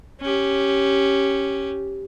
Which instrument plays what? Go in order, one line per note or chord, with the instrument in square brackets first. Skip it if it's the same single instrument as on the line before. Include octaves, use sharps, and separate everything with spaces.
[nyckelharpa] C#4 G4